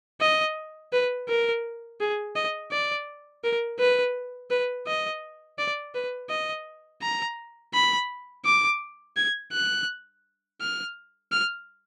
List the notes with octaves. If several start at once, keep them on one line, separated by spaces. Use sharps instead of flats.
D#5
B4
A#4
G#4
D#5
D5
A#4
B4
B4
D#5
D5
B4
D#5
A#5
B5
D6
G#6
F#6
F6
F6